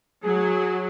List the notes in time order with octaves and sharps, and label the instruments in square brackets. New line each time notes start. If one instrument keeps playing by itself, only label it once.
[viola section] F#3 [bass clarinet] G#4